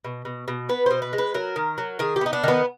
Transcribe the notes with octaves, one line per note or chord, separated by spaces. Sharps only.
B2
B2
B2
B3 B4
B2 C5
B4
G#3
B4
F#3 A#4
D#3
F#3
D#3 G#4
G4
B3 D#4
D4
D#3 B3